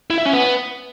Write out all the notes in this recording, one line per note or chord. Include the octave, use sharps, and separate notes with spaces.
E4
E5
C#4
B3